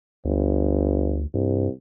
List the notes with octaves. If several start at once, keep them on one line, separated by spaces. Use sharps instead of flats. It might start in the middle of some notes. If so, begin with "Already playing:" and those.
G1 D2
C2 G2